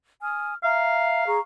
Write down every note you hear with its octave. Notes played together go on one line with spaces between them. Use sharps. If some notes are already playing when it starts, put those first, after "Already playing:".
G#5 D#6 F6
E5 F5 A#5
G#4 A#5 C#6